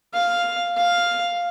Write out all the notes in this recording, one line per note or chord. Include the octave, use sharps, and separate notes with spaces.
F5
F5